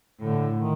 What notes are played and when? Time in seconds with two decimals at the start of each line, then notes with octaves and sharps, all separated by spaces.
0.21 A2 D3
0.58 D#3